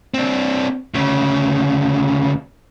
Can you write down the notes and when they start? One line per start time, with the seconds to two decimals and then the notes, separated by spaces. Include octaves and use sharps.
0.14 C4 D4
0.94 D2 C#3